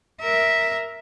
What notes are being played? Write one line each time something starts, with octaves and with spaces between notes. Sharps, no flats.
A#4 E5